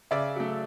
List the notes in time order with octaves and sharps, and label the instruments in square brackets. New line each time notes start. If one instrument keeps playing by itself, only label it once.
[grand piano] C#3 D5 E5
F#3 A3